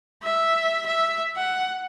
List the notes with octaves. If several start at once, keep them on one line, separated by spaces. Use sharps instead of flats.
E5
E5
F#5